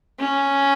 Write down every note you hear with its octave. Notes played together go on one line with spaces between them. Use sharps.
C#4